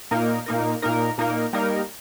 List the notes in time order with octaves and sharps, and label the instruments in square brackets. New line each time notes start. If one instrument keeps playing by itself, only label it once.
[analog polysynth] A#2 A#3 D#4 A#4
A#2 A#3 D#4 A#4
A#2 A#3 D#4 A#4
A#2 A#3 D#4 A#4
G3 A#3 D#4 A#4